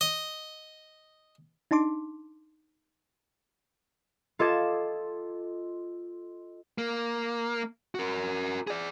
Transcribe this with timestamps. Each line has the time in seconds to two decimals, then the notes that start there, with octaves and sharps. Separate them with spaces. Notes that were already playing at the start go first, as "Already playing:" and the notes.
0.01 D#5
1.71 D4 D#4 A5 C6 D6
4.39 F4 A4 D#5 D6 G#6 E7
6.78 A#3
7.95 F#4 A#4
8.67 G#4 D5